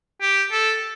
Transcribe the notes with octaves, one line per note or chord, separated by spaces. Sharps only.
G4
A4